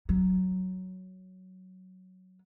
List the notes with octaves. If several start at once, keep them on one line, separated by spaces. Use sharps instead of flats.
F#3